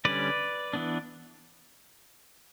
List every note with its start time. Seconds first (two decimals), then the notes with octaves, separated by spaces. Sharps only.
0.05 D3 G3 C#4 B4 D5
0.73 E3 B3 D4